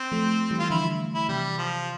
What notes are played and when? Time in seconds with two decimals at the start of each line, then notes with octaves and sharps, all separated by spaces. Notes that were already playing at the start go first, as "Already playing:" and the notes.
Already playing: C4
0.12 F3 A3
0.51 E3 G3
0.59 F4
0.70 D3 F3 E4
1.14 E4
1.29 C3 E3 G3
1.58 F3